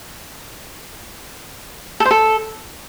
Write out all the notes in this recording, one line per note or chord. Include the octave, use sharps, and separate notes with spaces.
A4
C5
A4